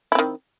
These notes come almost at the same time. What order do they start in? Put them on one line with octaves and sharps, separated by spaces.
E4 C4 D#3